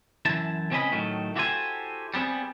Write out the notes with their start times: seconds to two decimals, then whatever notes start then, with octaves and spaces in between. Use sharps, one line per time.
0.25 F#2 E3 E4 A5
0.71 C#2 C4 C#4 G#4 D#5 B5
0.92 A2 D#3 F#3 A3
1.36 E4 F#4 G4 A4 C5 G#5
2.14 G3 B3 C4 G#4